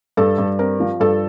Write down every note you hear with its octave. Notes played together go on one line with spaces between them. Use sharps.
G2 A4
G2
C4 A#4
F3
G2 A4